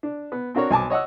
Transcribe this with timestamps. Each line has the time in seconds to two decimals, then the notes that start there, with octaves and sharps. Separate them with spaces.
0.03 D4
0.32 B3
0.55 C4 D4 F#4 A#4 C#5
0.71 B1 G#5 A5 D6
0.90 C#5 D#5 F#5 E6